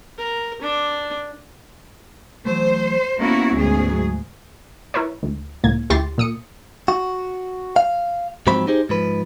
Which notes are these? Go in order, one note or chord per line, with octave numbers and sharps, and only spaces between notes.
A#4
D4
E3 F#3 A3 C5
A#3 B3 C#4 E4 F#4 A4
D2 G#2 G#4
F#3
E4 A#4 B4 C#5
D2
C#2 A2 A#3 G#6
D2 E4 G4 C6 A6 C7
A#2 D#6 C#7
F#4
F5
G#2 F3 F#3 C4 B5
D#4 G4 G#4 C5
G#2 F3 B4